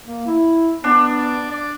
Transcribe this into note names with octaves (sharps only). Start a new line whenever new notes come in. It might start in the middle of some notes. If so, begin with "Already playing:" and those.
A#3
E4
B3 D4
D5
D5